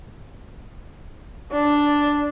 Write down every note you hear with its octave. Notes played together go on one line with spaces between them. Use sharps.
D4